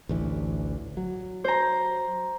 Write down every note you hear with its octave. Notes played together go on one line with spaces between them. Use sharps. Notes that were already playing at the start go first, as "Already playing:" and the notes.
A1 D2 E3
F#3
C5 A#5